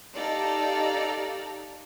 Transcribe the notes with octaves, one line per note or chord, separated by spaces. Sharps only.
D#4 G4 A4 D5 F5 A#5